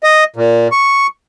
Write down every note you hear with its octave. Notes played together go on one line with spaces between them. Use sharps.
D#5
A#2
C#6